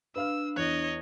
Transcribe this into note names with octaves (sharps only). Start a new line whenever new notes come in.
D4 B4 F5 E6 F6
E2 C#5 D#5 F#6